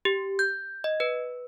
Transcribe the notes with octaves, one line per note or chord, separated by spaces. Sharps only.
G4
G6
D#5
B4